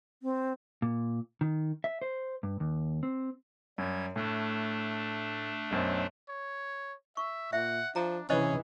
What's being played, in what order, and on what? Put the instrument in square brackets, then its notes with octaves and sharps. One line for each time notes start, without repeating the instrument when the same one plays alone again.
[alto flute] C4
[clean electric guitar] A#2
D#3
E5
C5
G2
D#2
C4
[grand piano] F#2 [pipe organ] G3 G#6
[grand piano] A2 [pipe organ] A3 D4
[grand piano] B1 F#2 C5
[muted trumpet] C#5
[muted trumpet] E5 [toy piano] C#6
[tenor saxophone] A#2 [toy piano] E5 [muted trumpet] F#5
[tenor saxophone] F3 [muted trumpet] D4 [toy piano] A#5
[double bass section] C3 E3 [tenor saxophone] C#4 [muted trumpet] G#4 [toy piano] C5 D#5